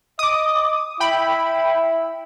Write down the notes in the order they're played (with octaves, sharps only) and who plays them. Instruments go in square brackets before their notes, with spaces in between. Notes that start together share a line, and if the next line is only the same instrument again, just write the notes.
[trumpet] D#5 [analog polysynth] D6 D#6
[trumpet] E4 [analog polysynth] G5 B5